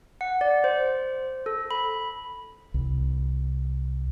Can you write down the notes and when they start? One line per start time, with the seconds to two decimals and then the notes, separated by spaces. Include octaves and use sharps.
0.21 F#5
0.41 D5
0.64 C5
1.46 A4
1.71 B5
2.74 C2